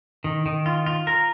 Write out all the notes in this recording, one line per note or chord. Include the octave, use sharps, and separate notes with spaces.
D#3
D#3
F4
F4
A#4